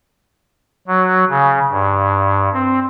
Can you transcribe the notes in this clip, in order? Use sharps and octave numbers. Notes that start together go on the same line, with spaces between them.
F#3
C#3
G2
C4